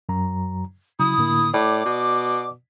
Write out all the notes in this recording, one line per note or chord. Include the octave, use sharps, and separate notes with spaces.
F#2 F#3 A#5
C#3 F#3 E4 D#6
A2 D3 A#3
A2 D5 D6
B2